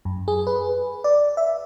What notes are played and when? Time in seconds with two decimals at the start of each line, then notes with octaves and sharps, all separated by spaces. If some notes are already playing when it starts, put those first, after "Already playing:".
0.05 F#2
0.28 G#4
0.47 B4
1.04 D5
1.37 E5